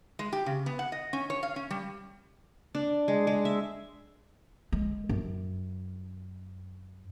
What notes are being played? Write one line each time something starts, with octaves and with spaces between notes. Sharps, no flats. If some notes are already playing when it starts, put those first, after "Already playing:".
G#3
G4
C#3
B3
F#5
D#5
C#4
C#5
F5
C#4
G3
D4
G#3
G#3
E5
G#3
F#2